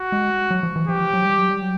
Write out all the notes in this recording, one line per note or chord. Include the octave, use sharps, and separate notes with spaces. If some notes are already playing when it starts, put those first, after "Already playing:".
Already playing: F#4
G#3
F#3
F3
E3
F3 G4
F#3
G3
F#3
G3
F#3